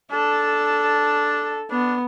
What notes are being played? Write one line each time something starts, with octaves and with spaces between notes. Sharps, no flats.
D4 A4
B3 D4